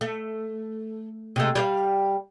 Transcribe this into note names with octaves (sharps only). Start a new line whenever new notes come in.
A3
C3 G#3 A3
G3 G4 F5